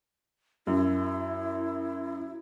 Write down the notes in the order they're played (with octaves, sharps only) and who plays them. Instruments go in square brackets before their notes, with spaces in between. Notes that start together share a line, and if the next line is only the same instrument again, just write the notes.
[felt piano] F#2 [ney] E4